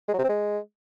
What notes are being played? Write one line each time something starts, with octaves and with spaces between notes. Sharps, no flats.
G#3
F#3
C3
C4
G#3